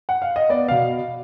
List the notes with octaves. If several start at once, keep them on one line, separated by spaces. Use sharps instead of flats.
F#5
F5
D#5
B3 D5
B2 F5